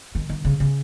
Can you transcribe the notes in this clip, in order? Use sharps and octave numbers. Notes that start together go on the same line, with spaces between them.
D#3
D#3
C#3
C#3